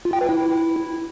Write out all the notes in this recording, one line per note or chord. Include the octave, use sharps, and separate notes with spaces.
F4
G5
B4
E4